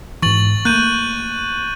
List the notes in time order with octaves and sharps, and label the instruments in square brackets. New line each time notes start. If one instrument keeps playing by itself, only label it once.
[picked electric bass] G#2 E3 [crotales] C#6 A6 F#7
[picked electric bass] A3 A#3 [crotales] F#6 G6 D#7